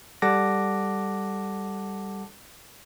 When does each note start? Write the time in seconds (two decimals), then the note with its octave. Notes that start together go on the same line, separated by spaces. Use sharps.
0.22 G3 A4 F#5 A5 D6 A#6